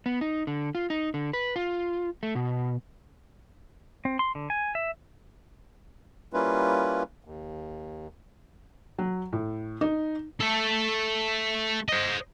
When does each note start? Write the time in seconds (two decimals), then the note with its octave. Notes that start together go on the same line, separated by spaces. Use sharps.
0.06 B3
0.21 D#4
0.47 D3
0.75 F4
0.90 D#4
1.14 D3
1.33 B4
1.56 F4
2.23 A3
2.35 B2
4.05 C4
4.19 C6
4.35 D3
4.50 G#5
4.75 E5
6.33 G3 A#3 C#4 E4 F4 B4
7.24 D#2
8.98 F#3
9.33 A2
9.81 D#4
10.40 A3 A4
11.89 C5 D#5